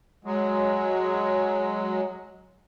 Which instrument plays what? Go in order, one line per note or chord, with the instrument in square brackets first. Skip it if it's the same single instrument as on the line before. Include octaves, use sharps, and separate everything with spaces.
[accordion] F#3 G#3